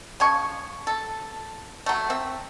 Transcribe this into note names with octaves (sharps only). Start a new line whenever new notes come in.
C#3 F3 G#5 C#6
A4
F#3 A3
C4 E5